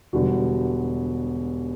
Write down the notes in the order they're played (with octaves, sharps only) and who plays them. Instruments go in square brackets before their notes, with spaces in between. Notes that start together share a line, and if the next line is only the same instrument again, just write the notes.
[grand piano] E1 E2 D3 G3 F#4